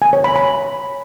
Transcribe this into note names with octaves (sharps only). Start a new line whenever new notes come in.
G#5
C#5
B5
B5